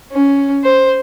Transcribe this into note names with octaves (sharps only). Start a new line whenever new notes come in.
C#4
C5